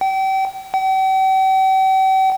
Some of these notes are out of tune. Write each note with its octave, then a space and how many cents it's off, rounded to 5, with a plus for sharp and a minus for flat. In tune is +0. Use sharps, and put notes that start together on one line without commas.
G5 -35
G5 -45